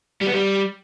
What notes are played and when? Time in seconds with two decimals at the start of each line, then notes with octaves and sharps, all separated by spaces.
0.21 G3
0.27 B3
0.33 G3